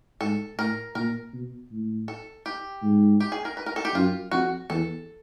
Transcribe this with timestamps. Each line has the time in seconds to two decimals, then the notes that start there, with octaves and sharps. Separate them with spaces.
0.21 G#2 A4
0.57 A2 A#4
0.95 A#2 A#4
1.33 B2
1.71 A2
2.08 A4
2.46 G4
2.82 G#2
3.20 G4
3.32 G#4
3.45 A#4
3.57 B4
3.66 A#4
3.76 A4
3.85 G4
3.94 F#2 F4
4.31 F2 F#4
4.70 E2 A4